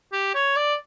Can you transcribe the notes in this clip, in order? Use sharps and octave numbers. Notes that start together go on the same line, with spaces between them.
G4
C#5
D5